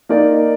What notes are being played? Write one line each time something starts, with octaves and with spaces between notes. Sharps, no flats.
A#3 D#4 A#4 D5